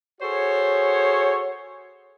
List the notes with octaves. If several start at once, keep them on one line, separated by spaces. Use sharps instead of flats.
F#4 G#4 A4 C5 C#5